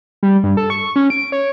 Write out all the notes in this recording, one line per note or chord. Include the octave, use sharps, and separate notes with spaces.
G3
G2
A4
C#6
C#4
D7
C#5